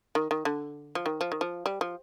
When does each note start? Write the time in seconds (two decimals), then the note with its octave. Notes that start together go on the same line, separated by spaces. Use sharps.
0.15 D#3
0.31 D#3
0.45 D3
0.95 F3
1.06 D#3
1.21 F3
1.32 D#3
1.41 F3
1.66 G3
1.81 F3